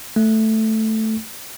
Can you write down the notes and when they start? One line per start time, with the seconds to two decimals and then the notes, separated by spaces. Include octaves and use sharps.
0.16 A3